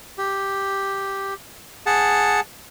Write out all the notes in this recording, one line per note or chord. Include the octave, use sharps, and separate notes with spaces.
G4
G#4 F#5 A5